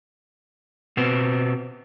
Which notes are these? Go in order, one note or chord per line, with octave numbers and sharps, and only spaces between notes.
B2 B3 C4